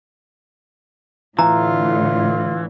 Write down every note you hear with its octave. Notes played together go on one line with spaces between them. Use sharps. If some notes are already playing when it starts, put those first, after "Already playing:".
A2 D3 E3 F4 A#5